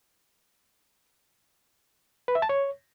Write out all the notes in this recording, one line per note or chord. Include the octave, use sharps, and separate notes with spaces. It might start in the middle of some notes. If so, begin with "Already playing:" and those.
B4
E5
A5
C#5